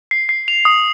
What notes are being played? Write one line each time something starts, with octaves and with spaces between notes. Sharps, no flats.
C7
C7
F7
D#6